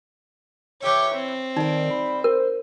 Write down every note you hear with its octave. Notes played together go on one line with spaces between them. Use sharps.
E3 G4 C#5 E5
C4
D#3 G3 D#4 A#4
B5
A#4 C5